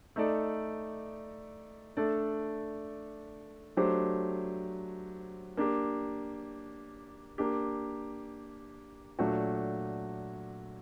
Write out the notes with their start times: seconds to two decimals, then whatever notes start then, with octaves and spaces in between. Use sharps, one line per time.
0.16 A3 D#4 A4 D5
1.97 A3 D4 A4 D5
3.77 F#3 A3 D4 G4 C5
5.57 A#3 D4 G4
7.38 A#3 D4 G4
9.19 A#2 F#3 A3 D4 F#4